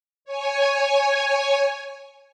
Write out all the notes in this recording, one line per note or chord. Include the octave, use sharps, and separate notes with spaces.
C#5 G#5